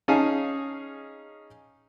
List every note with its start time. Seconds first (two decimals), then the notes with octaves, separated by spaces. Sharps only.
0.08 C#4 D#4 G#4 F5 G#5 A5